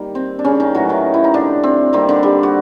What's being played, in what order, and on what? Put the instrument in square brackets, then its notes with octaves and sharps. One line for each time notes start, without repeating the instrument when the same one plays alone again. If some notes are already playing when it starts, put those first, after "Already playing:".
Already playing: [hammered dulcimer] D#3 G3 A#3
C4
D4
C#3 C#4
D#3 D#4
A2 E3 F#3 G3 F#4
D#3 D#4
E4
D#4
D3 D4
C4
D#3 G3 A#3 C4
D3 D4
G3 G4
F#4